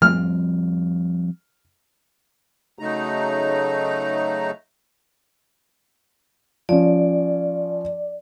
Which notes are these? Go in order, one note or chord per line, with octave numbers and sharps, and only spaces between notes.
F3 G3 C4 F6
C#3 F#3 A3 D#4 A#5
F3 C#4 D5